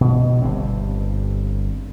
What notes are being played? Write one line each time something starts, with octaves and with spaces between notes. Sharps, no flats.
B2
G1 G2 C4